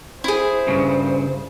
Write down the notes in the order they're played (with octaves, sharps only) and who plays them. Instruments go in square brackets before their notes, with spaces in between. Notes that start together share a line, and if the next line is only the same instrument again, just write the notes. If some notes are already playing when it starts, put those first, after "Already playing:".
[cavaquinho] E4 G#4 [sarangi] C5
[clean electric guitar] G2 A#2 C#3